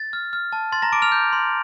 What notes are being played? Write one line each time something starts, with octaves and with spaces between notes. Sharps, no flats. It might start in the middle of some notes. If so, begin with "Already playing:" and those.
Already playing: A6
F6
F6
A5
C6 A6
A#5 A#6
A5 D6 D7
F6 F7
G6
C6